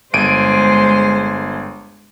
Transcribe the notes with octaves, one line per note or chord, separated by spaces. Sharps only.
G1 G#3 C5 D7 D#7